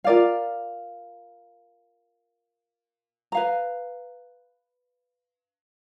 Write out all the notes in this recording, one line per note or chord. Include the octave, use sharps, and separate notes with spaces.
F4 A#4 D5 F5
B4 F5 A#5